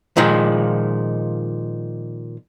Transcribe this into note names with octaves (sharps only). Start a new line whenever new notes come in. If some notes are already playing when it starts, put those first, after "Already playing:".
A#2 D#3 F3 G#3